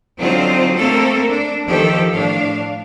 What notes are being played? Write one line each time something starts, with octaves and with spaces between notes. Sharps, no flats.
D3 F#3 C4 D#4 F4 C5
A3 A#3 C4 A4 A#4
D4
D#3 F3 G4 A4
A2 D4 F5